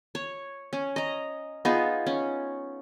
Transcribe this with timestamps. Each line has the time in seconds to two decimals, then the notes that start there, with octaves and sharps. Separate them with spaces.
0.15 C#5
0.73 C#4
0.96 D#5 A#5
1.65 B3 D#4 F4 G#4
2.07 C#4